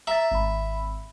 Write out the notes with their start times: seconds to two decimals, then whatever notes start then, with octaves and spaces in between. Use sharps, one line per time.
0.07 E5 A#5 A6
0.31 G#1 B5